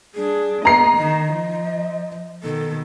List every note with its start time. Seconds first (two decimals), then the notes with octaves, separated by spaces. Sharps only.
0.15 G3 D4 G#4
0.65 B3 D#5 A#5 C7
0.97 D#3 D#5
1.32 F3
2.43 B2 D#3 A4